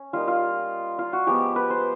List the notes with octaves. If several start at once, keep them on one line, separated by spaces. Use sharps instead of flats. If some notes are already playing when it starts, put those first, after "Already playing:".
Already playing: C#4
G3 A#3 D#4 F4
F4
F4
F#4
F3 G#3 B3 G4
B4
C5